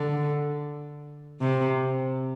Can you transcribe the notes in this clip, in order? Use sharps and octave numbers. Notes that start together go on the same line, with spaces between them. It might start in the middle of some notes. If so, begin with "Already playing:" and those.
Already playing: D3
C3